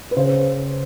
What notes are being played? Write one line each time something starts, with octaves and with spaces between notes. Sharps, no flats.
B4
C#3 C5